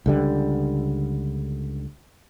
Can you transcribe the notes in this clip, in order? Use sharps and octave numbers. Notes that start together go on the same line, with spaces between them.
C#2 D3 G3